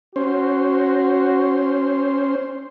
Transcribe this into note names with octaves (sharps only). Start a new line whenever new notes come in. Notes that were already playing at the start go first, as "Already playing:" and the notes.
C#4 F#4 C5